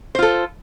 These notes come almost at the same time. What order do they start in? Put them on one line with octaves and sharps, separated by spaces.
C5 F4 A4